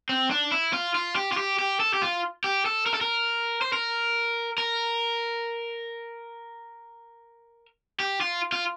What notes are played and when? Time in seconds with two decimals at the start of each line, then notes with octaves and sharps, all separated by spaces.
0.09 C4
0.31 D4
0.52 E4
0.73 F4
0.95 F4
1.16 G4
1.32 F4
1.37 G4
1.59 G4
1.80 A4
1.94 G4
2.02 F4
2.44 G4
2.66 A4
2.86 A#4
2.94 A4
3.01 A#4
3.61 C5
3.73 A#4
4.58 A#4
8.00 G4
8.21 F4
8.52 F4